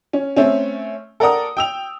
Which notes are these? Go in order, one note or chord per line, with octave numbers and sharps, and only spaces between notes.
C#4
A3 C4 C#4
A4 A#4 D5 F#5 A#5 D#6
G5 E6 F7